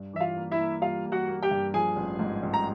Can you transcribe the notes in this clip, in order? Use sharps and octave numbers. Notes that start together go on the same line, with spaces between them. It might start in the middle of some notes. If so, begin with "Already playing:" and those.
Already playing: G2
E3 E5
F4 F5
A#3
E4 E5
A#3
G3 F4 F5
A#3
F#4 F#5
A#3
G4 G5
G2
F3 G#4 G#5
A1
G#2
A1
A#5